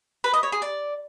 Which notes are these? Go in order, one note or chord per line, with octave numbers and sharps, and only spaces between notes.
B4
D#5
C#5
G#4
D5